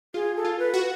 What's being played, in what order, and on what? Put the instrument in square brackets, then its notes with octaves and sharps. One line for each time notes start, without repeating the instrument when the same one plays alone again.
[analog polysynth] F4 [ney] G#4
[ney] A4
[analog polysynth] F4
[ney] B4
[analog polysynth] F#4